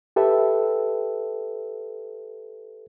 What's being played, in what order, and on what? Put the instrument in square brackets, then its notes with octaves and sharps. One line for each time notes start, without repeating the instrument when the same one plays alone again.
[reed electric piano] G4 A4 B4 E5